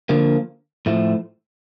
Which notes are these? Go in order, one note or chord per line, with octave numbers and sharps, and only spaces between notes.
D3 F3 A#3
A2 F3 A3